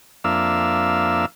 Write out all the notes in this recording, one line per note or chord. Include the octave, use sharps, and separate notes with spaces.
F2 A#3 D4 E5 F5 E6